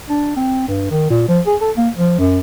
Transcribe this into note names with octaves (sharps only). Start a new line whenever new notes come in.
D4
C4
G2
D#3
A#2
F3
G#4
A4
A#3
F3
F#2